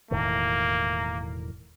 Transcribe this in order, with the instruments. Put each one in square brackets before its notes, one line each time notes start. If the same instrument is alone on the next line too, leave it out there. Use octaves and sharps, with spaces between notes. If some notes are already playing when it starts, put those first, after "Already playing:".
[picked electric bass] E1 A2 D#3 [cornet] A#3